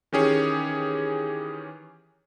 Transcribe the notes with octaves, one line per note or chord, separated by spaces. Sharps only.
D#3 E3 C#4 G4 G#4 C#5